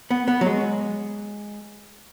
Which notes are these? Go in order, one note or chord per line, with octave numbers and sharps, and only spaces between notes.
B3
B3
F#3
G#3